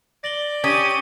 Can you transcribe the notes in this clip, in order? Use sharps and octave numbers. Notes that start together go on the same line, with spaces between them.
D5 A#6 F#7 G7
C#4 G4 D6 D#6 D#7